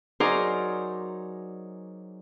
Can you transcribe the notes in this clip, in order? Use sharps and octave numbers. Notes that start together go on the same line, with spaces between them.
F#3 D#4 G#4 A#4 C5 D5